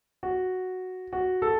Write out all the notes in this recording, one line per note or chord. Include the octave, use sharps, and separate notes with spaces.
F#4
F#4
A4